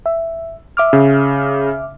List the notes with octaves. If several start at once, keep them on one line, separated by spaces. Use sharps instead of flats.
E5
E5 D6 F6
C#3